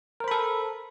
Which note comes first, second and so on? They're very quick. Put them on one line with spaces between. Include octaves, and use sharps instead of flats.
A#4 C5 B5 A4